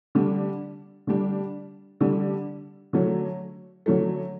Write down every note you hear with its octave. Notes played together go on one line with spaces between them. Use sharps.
D3 G3 D4
D3 G3 D4
D3 G3 D4
D3 F#3 A3
D3 F#3 A3